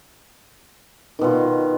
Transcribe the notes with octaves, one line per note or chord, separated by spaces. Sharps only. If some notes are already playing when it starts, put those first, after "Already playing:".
B2 D#3 F4